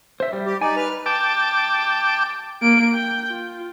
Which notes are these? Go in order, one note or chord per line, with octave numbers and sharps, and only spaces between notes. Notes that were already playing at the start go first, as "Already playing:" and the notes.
C5 E5
G3
G4
D#4 D5 G#5
B4 F6
G5 A5 D6
A#3 D7
G5
F4